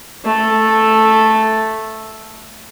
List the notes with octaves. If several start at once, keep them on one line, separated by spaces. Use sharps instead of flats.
A3 A4